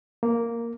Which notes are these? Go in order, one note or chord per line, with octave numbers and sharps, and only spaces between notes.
A#3